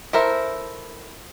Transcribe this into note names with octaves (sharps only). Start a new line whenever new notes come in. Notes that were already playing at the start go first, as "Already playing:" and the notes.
E4 A4 A#4 C5 E5